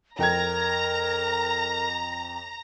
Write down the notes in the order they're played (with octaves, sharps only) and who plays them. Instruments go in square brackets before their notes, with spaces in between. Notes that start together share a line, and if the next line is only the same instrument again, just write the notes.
[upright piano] F2 G5 G#6 [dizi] A#4 [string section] A#5